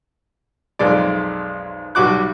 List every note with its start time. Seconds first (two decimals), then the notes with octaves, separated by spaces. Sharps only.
0.79 B1 F2 G#3 D5
1.95 B1 G3 F#4 D6 F#6